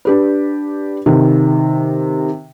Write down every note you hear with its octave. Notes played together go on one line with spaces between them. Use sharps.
D4 G4 B4
C3 D#3